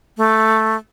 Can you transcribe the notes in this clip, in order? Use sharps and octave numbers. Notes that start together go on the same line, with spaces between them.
A3